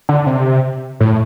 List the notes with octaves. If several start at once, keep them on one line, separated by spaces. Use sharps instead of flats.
D3
C3
A2